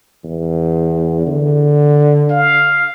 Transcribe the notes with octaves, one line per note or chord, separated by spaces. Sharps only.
E2
D3
F5